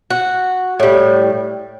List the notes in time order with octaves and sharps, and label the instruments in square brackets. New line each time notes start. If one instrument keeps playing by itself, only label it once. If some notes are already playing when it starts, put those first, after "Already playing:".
[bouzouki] F#4
A2 G3